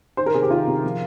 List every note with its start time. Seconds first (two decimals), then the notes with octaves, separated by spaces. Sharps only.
0.17 D#3 C5
0.26 A#4
0.34 C3 G#4
0.42 G4
0.50 D#3 F4
0.67 C3
0.84 F3